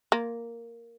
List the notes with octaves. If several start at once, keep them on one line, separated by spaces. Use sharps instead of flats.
A#3